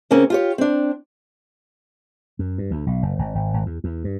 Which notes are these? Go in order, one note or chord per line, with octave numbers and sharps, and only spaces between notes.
C#3 A#3 C4 C#4
F4 G4 C#5
C4 D4
F#2
G2
D2
B1
F#1
G#1
G#1
G#1
E2
E2
G2